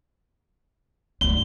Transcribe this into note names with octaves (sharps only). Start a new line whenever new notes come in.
D2 G#2 G7